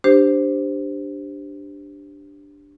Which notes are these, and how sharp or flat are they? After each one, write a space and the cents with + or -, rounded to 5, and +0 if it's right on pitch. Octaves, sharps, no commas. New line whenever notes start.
D4 +0 G4 +0 C5 -5